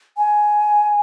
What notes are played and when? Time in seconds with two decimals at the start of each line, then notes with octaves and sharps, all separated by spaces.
0.17 G#5